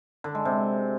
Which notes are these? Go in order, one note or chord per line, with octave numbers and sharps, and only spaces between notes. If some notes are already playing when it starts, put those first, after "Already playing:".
D3
G#3
C3